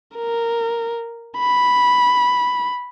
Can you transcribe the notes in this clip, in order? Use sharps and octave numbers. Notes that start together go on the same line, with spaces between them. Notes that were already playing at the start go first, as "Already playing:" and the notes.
A#4
B5